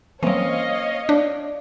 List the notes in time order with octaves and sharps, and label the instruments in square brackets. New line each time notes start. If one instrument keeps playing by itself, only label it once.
[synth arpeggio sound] E3 F#3 [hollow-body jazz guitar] A#3 C4 C#4 [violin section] C#5 D#5 F5
[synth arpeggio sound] D4 [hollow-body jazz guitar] D5